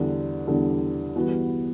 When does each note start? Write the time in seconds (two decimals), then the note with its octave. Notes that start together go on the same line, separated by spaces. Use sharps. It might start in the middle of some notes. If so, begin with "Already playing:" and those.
Already playing: E2 D3 G3 D4
0.47 E2 D3 G3 D4
1.16 G2 E3 B3 F#4